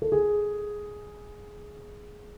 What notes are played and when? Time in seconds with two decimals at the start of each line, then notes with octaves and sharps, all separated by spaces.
0.02 A4
0.12 G#4